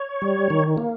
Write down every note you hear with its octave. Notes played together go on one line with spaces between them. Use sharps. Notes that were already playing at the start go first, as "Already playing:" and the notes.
Already playing: C#5
G3
D#3
A#3